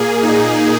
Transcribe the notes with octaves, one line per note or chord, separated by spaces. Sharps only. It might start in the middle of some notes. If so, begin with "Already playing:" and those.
Already playing: A#2 A#3 G#4
D#4